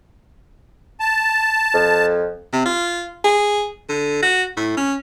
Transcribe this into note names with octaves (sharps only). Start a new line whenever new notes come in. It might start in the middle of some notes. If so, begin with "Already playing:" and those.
A5
F2
C3
F4
G#4
D3
F#4
A2
C#4